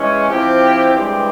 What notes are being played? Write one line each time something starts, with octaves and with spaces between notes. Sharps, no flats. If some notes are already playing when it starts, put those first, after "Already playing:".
Already playing: E3 G#3 C#4
F3 C4 E4 G4
G2 E3 G#3 C4 G4